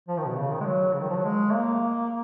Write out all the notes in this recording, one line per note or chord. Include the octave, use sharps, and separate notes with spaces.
F3
D#3
B2
C#3
D#3
G#3
F#3
C#3
D#3
F3
F#3
G#3
A#3